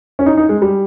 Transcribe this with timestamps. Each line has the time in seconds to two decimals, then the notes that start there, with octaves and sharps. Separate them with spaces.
0.19 C#4
0.26 D#4
0.37 D#4
0.49 G#3
0.62 G3